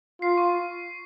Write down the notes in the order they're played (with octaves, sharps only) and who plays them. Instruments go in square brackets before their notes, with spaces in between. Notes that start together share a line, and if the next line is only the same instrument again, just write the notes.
[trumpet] F4 [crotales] C7
[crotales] C#6